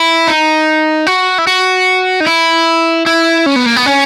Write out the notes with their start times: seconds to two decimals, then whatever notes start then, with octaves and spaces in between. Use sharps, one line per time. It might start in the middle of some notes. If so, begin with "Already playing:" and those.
Already playing: E4
0.28 D#4
1.07 F#4
1.38 E4
1.47 F#4
2.20 D#4
2.27 E4
3.06 E4
3.46 C#4
3.56 B3
3.66 A#3
3.76 B3
3.86 C#4